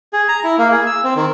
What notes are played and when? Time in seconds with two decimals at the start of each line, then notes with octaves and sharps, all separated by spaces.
0.13 G#4
0.29 A#5
0.44 E4
0.58 A#3
0.72 G#4
0.86 E6
1.04 C4
1.16 D#3